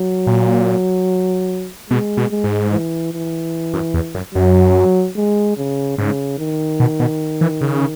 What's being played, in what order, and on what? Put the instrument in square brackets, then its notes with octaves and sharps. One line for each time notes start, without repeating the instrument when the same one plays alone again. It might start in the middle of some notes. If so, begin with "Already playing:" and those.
Already playing: [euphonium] F#3
[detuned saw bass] A#2
[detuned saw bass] B2 [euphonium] G#3
[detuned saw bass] B2
[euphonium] G#3
[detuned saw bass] G#2
[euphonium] E3
E3
[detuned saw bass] F#2
E2
F#2
[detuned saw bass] F#2 [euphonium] F#3
[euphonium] G#3
C#3
[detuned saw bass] G#2 [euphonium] C#3
[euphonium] D#3
[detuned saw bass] B2
B2
E3
C#3